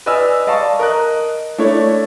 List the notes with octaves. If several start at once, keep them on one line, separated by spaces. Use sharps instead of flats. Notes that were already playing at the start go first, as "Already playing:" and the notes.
B4 D5 D#5 G#5 E6 F6
D5 D#5 F5 A5 C#6
A#4 D#5 F#6
A3 D4 E4 A4 C#5